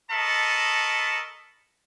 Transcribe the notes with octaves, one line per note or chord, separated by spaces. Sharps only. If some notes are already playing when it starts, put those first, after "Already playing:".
A4 A#4 D#5 A5 B5 C#6